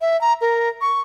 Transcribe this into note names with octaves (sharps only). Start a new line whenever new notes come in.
E5
A#5
A#4
C#6